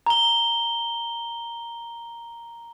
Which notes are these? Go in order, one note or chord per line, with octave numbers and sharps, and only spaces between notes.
A#5 G7